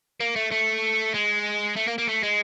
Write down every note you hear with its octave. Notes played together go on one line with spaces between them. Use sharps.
A#3
A3
A3
G#3
A3
A#3
A#3
A3
G#3